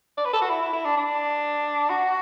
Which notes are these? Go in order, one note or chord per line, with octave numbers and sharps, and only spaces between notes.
D5
B4
A4
F#4
E4
E4
E4
D4
D4
F#4